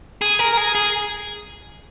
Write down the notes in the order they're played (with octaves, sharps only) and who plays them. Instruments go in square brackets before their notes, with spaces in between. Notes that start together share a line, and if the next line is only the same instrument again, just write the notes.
[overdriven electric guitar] G#4
A#4
G#4
G#4